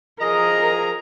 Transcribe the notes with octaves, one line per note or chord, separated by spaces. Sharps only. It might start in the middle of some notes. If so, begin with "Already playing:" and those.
F3 G#4 A#4 D#5 A#5